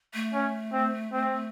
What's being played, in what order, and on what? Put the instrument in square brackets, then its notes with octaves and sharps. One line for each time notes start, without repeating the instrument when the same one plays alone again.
[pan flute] A3
[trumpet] C#4
C4
C4